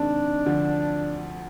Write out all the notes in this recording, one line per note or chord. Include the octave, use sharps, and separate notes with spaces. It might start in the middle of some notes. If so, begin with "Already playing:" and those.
Already playing: C3 D#3 G#3 C4 D4
D2 D3 F3